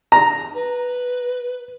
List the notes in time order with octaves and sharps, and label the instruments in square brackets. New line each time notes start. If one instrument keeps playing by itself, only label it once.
[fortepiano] A#5
[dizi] B4